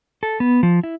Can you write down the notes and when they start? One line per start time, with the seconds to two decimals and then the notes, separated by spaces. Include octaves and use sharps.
0.23 A4
0.40 B3
0.63 F3
0.84 E4